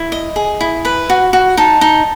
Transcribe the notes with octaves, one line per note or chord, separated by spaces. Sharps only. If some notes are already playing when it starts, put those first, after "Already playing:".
Already playing: E4
D#5
G#4
E4
B4 B5
F#4
F#4
D#4 A5
D#4